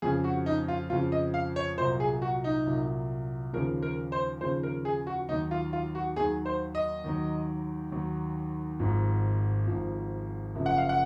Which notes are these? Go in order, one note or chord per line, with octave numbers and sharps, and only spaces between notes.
F2 C#3 F3 G#4
F#4
D#4
F4
F2 C#3 F3 F4
D#5
F5
C#5
C2 A#2 F#3 C5
G#4
F#4
D#4
C2 A#2 F#3
D#2 C#3 F3 A#4
A#4
C5
D#2 C#3 F3 C5
A#4
G#4
F#4
D#2 D#3 F#3 D#4
F4
F4
F#4
D#2 D#3 F#3 G#4
C5
D#5
D#2 D#3 F#3
D#2 D#3 F#3
G#1 G#2 F3
G#1 G#2 F3
F#1 F#2 F3
F#5
F5
F#5